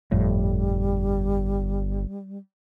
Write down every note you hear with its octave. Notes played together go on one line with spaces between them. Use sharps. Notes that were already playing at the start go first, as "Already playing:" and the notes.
G1 F2 A2 G3